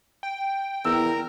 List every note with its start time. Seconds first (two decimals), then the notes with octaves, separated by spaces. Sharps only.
0.23 G5
0.85 E2 A#4 E6